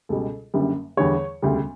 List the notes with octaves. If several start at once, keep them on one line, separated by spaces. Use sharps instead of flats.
C#2 B2 G3 A4
F#1 F#2 D3 G3
E2 D3 G3 C#5
E1 D2 C#3 G3